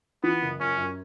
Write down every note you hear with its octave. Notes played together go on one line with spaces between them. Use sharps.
E3 B3
F#1
F#1 C#4
F#2